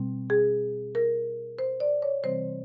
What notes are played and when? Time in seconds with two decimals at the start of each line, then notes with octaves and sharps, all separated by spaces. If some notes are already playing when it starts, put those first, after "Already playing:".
Already playing: B2 G3 C4
0.30 G#4
0.95 A#4
1.59 C5
1.80 D5
2.02 C#5
2.23 C3 E3 G3 C4 C5